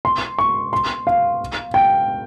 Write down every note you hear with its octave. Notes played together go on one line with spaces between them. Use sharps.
C6
C#6
C6
F5
G5